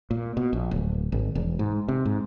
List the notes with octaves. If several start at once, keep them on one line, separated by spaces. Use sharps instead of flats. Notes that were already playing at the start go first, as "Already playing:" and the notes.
A#2
B2
A#1
D1
G#1
E1
G#2
C3
G#2